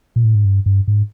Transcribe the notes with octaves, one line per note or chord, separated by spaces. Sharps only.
A#2
A2
G#2
G2
G2
G#2